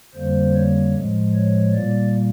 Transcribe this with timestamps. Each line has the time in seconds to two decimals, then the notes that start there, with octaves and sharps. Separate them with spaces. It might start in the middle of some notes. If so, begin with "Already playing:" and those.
0.14 F2 D3 G3 A#3 C5
0.54 C#5
0.94 A2 F3 G#3
1.34 C#5
1.73 A#2 G3 A#3 D5